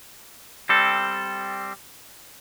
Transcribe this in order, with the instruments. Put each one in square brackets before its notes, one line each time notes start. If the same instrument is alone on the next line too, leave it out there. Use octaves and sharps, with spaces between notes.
[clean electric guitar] G3 C4 A4